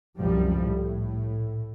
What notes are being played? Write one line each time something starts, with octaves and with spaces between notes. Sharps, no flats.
C2 F#2 F3 G3
A2